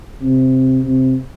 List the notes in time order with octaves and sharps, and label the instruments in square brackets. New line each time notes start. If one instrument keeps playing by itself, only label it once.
[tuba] C3
C3